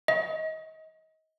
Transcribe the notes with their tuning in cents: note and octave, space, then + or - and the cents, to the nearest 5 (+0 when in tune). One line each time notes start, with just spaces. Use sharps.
D#5 +30